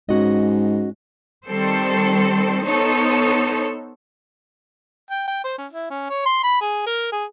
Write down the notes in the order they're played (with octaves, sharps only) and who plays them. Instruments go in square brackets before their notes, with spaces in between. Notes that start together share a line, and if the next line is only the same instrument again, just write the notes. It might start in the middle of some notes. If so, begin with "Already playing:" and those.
[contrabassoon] G#2 [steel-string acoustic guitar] C#4 F#4 D#5
[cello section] D#3 G3 C4 A4 C5
B3 D#4 A4 C5 C#5
[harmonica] G5
G5
C5
C#4
E4
C#4
C#5
C6
B5
G#4
A#4
G#4